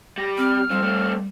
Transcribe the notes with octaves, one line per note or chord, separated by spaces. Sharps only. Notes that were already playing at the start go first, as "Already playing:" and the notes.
G3 A#6
C4 F6
F3 G3 C4
A3 C4